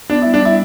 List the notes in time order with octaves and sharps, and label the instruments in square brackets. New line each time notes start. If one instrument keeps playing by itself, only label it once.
[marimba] B3 [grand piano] D4
[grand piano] E4
[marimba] G3
[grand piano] D4
[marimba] G3 [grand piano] E4